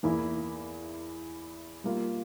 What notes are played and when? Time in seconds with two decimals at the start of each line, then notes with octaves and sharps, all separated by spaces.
0.03 E2 E3 A#3 E4
1.84 G3 A#3 F4